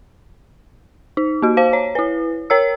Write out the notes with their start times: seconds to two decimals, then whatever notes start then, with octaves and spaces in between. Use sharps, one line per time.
1.17 D#4
1.42 A#3 F#4
1.57 C5 F5
1.73 C#5
1.95 E4 B4
2.50 A#4 C#5 E6